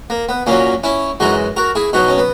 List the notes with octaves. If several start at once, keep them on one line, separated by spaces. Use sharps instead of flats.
A#3
B3
A#2 F#3 A#3 C#4
C#4 E4
F#2 E3 G#3 D#4 F#4
F#4 A#4
E4 G#4
B2 F#3 D#4 F#4
C#4
B3